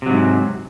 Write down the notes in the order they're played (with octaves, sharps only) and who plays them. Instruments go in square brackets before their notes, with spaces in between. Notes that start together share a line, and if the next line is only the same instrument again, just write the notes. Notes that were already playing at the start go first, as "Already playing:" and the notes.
[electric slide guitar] C3
F#3
G#2